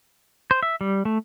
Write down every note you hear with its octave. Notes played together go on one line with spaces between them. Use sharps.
C5
E5
G3
A3